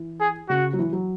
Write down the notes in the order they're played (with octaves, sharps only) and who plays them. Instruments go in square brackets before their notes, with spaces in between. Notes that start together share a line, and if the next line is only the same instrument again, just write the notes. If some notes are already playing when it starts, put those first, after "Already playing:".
Already playing: [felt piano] E3
[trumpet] G#4
[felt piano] C#3 [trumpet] F#4
[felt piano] F#3
E3
F#3